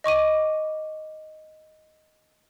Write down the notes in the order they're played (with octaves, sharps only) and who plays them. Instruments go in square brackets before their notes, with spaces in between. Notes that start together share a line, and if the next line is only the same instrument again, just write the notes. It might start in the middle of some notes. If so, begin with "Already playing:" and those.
[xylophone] D#5 C#6 D6 D#7